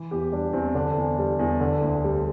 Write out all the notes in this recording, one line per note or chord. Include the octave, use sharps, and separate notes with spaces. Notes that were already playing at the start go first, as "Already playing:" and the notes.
Already playing: E3
E2 G4
G3 D4
E2 C4
D3 D4
E2
G3
E2
D3
D2
G3